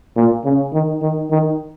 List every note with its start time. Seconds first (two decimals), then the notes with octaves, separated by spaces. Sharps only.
0.16 A#2
0.45 C#3
0.73 D#3
1.02 D#3
1.31 D#3